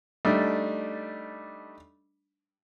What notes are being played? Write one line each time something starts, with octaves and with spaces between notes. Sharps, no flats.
G3 A3 D4 D#4